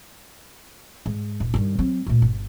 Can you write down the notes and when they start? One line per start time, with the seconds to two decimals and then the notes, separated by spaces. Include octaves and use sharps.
1.06 G#2
1.40 D#1
1.54 G2 D#3
1.79 F#3 C4
2.07 D2 A#2
2.22 G1